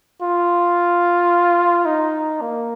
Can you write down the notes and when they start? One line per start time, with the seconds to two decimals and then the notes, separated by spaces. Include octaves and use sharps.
0.22 F4
1.86 D#4
2.41 A#3